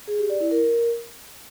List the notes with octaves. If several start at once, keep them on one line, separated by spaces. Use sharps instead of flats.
G#4
G4
D5
E4
A#4